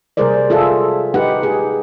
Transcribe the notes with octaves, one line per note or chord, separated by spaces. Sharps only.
C3 G3 G#4 A#4 C5 D5
F4 G#4 A4 E5
D#4 G4 B4 F#5
G#4